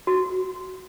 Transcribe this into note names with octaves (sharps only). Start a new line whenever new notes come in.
F#4